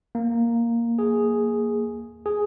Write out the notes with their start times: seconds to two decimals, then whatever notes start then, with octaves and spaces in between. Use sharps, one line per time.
0.15 A#3
0.99 G#4
2.26 G#4